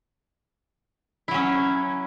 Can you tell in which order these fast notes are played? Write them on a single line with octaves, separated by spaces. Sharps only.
E4 F#3 C#4